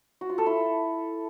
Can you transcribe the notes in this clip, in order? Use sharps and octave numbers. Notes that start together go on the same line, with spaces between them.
F#4
F4
A4
E4